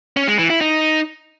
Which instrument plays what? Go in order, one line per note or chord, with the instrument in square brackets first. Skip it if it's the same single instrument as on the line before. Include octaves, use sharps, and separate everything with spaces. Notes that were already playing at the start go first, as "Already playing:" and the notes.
[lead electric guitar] C#4
G#3
E3
E4
D#4